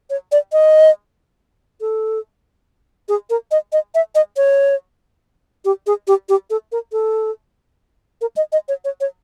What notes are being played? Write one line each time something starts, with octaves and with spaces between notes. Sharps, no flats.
C#5
D5
D#5
A4
G#4
A#4
D#5
D#5
E5
D#5
C#5
G4
G#4
G4
G4
A4
A#4
A4
A#4
D#5
D#5
C#5
C#5
C#5